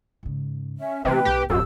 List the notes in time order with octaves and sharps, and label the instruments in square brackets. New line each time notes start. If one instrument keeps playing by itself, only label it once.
[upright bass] G#2 C#3
[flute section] C#4 E5
[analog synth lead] C3 [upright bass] E3 A3 [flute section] B4 G5
[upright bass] B1 B3 [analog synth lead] G4
[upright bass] D1 [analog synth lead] F#2 [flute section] G4 E6